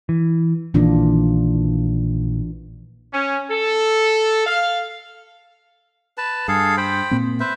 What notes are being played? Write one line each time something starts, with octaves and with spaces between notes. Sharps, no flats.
E3
A#1 D#3 E3 A#3 D4 F4
C#4
A4
F5
B4 A5
G2 G#4 A4 F5
C5 G5 B5
A#2 A#3 C4
B4 C5 E5